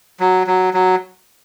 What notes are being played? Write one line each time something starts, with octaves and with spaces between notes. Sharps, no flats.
F#3
F#3
F#3